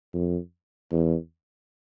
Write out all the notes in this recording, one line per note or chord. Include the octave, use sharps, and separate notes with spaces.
F2
E2